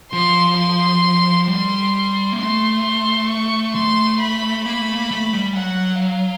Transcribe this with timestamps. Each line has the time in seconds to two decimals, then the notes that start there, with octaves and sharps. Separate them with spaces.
0.12 F3 C6
0.58 C6
1.48 G3 C6
2.32 A#3
2.39 A3 C6
2.84 C6
3.29 C#6
3.75 A3 C6
4.21 B5
4.65 A#3 B5
4.81 A3
4.95 A#3
5.11 A3
5.33 G3
5.56 F#3 F#5
6.02 F5